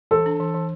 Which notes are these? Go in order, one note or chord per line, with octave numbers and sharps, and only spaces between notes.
E3 A4
D4
E3
E3